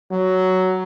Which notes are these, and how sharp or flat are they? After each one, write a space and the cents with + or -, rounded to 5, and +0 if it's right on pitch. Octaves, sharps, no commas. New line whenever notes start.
F#3 +10